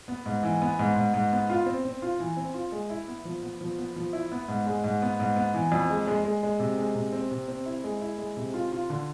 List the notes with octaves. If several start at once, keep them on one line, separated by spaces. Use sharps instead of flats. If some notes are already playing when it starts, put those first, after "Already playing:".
B3
G#2
E3
B3
G#2
G#2
G#2
B3
F4
C4
C4
F4
E3
C4
F4
G#3
E4
B3
F3
B3
F3
B3
F3
E4
B3
G#2
G#3
G#2
B3
G#2
B3
E3
F2
G#3
G#3
G#3
G#3
C3
G#3
C3
C4
C3
C4
E4
G#3
E4
G#3
C3
F4
F4
D3